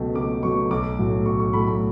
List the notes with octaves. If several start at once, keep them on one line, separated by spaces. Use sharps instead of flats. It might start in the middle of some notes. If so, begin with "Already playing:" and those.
Already playing: C#2 B2 F#3 A3 G5
C#2 D6
B2 F#3 A3 C#6
B1 D6
A2 F#3 A3
B1 C#6
C#6
A2 F#3 A3 B5
B5